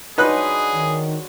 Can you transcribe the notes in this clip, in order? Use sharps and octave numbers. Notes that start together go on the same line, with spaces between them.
F#3 G#3 D4 D#4 G#4 B4 F#6
D#3